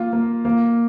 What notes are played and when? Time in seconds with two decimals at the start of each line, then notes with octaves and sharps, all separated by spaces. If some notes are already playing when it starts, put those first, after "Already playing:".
Already playing: A#3 F4
0.13 A#3
0.45 A#3